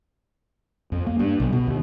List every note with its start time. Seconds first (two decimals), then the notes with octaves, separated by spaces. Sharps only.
0.92 F2
1.06 A#3
1.19 G2
1.40 B1
1.52 B2
1.67 D#2